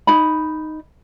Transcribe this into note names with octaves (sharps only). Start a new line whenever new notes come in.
D#4 B5